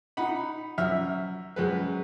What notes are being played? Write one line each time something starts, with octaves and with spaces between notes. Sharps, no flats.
D#4 F#5 B5
F#2 E5 F6
F#2 G#3 B4